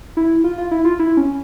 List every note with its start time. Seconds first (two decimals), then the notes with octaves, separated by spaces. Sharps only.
0.17 E4
0.44 F4
0.58 F4
0.71 E4
0.85 F4
0.99 E4
1.17 C#4